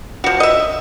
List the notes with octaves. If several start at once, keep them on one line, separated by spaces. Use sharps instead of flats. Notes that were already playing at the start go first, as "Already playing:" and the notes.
F3 F#4
D#5 E5